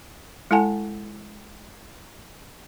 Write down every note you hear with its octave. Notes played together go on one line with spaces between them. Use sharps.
G#3 E4 A4 F#5 G#5 A5